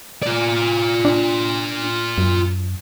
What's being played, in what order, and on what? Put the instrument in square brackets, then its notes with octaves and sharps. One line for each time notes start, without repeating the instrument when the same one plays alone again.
[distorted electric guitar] F4 D5
[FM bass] D4
F#2